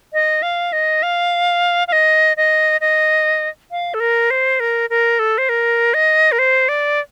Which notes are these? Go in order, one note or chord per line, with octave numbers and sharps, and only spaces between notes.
D#5
F5
D#5
F5
F5
D#5
D#5
D#5
F5
A4
A#4
C5
A#4
A#4
A4
C5
A#4
D#5
A#4
C5
D5